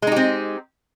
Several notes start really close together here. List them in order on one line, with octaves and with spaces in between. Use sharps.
G#3 D#4 G4 C4